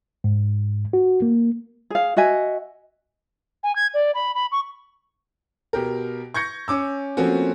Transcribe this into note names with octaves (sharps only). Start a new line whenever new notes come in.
G#2
F#4
A#3
G#4 F5
F#4 D#5 E5 G#5
G#5
G#6
D5
B5
B5
C#6
B2 G4 A#4
C#6 G6 G#6 A#6 C#7
C#4 D6 E6
F3 A3 A#3 C4 C#4 F#4